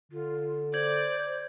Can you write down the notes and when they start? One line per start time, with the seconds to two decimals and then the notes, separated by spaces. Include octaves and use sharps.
0.12 D3 F4
0.74 C5 D5 G6 G#6 F#7